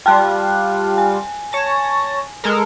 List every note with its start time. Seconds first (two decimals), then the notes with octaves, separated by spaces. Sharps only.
0.06 G3 F4 G5 A5 F#6
0.98 G#5
1.52 C#5 A5 A#6
2.44 G#3 A4 A#4